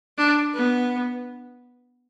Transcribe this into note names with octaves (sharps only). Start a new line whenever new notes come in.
D4
B3